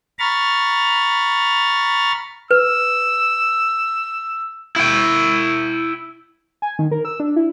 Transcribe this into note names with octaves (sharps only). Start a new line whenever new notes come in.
A#5 B5 C#6 F6 A6
B4 E6
E4 G5
G#5
D#3
A#4
E6
D4
E4